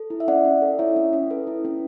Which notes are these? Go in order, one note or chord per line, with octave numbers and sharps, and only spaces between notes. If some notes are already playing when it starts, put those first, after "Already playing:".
Already playing: A4
E4
E5
C#4 D5 F#5
C#4
A4
E4 C#5 E5
C#4
C#4
A4 B4
E4
C#4